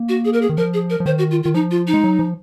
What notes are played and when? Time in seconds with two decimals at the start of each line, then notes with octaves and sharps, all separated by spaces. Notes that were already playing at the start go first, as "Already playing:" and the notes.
Already playing: A#3
0.09 F#4
0.25 G#4
0.33 A#4
0.42 G#4
0.49 D#3
0.57 F3 A#4
0.74 G#4
0.90 A#4
1.00 F3
1.06 D#3 C5
1.18 F#4
1.31 F4
1.43 D#3 F4
1.54 F3 D#4
1.71 F4
1.87 D#4
1.94 G#3
2.04 F#3
2.19 F3